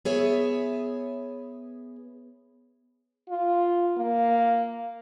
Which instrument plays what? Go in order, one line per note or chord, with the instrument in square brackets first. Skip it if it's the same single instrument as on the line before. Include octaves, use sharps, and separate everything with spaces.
[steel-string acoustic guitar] B3 G#4 C#5 E5
[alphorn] F4
A#3